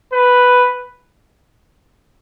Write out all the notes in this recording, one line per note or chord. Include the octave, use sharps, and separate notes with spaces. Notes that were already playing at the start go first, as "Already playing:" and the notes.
B4